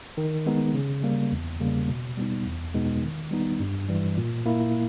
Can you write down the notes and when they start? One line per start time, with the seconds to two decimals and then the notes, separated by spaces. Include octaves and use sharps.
0.17 D#3
0.46 G#3 B3 D#4
0.74 C#3
1.03 G3 A#3
1.32 E2
1.60 C#3 G3 A#3
1.88 B2
2.18 G3 B3 D#4
2.46 E2
2.75 B2 G#3 B3 D#4
3.03 D#3
3.31 G3 B3 D#4
3.60 G2
3.89 E3 G3
4.17 A#2
4.46 A#3 E4